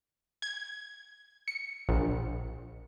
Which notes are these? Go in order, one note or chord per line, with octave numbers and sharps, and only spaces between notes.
G#6
C#7
A#1